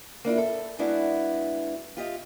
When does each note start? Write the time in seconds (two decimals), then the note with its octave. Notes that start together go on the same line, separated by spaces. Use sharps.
0.25 A#3 D4 E4 F4
0.38 A4
0.79 G#3 B3 D4 E4 F#4 F5
1.97 F4 G4 D#5